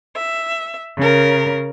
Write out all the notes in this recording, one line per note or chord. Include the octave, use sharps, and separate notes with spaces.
E5
C#3 A#4